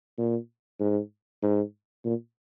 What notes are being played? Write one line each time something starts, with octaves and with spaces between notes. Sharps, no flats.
A#2
G#2
G#2
A#2